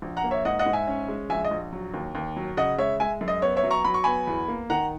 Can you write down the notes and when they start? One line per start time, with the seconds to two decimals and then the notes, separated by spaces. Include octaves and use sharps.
0.02 A#1
0.17 F#5 A#5
0.24 A#3
0.31 C#5 E5
0.45 G#2 D#5 F#5
0.59 D#5 F#5
0.66 G#2
0.73 E5 G#5
0.87 C#4
1.08 G#3
1.30 A#1 E5 G#5
1.45 D#5
1.51 A#1
1.73 F#3
1.94 D#2
2.15 D#2
2.37 F#3
2.57 C#3 D#5 F#5
2.78 G#3 C#5 E5
3.00 G#3 E5 G#5
3.21 F#2
3.28 D#5
3.42 B3 C#5
3.56 C#5 E5
3.63 F#3
3.71 A#5 C#6
3.85 F#3 B5
3.94 C#6
4.04 B3 G#5 B5
4.27 E2
4.48 A#3
4.70 D#3 F#5 A#5